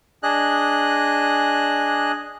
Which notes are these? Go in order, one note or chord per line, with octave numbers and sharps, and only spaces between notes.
D4 G#4 D#5 F#6